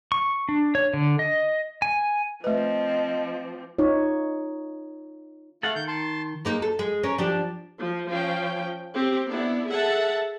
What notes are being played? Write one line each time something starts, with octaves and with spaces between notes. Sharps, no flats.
C#6
D4
C#5
D3
D#5
G#5
F3 A3 C4 B4 D#5
D#4 F4 C#5
A3 A4 F5 F#5
D#3 G6
A5 C6
G#3 A#3 D#4
A4
G#3
C#4 A#4 C#5
F3 D4 G4
F3
F3 C#4 G5
C4 G4
B3 D4 E4
G#4 A4 E5 F#5 A5